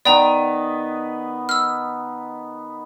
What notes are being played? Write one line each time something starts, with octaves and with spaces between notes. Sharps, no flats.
D#3 B3 D5 G5 A#5
E6 F6